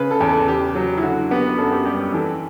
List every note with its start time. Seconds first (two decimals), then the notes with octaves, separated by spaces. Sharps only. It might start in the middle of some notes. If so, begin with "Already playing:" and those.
Already playing: C#3 B4
0.11 A4
0.21 E2
0.29 A4
0.47 E2 G4
0.75 F#3
0.98 E4
1.03 D3 F#4
1.30 B3 G4
1.47 B4
1.58 F#2 A4
1.72 G4
1.85 G3 G4
2.00 G4
2.13 E3 A4